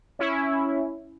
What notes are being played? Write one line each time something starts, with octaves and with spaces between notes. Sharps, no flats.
C#4 E4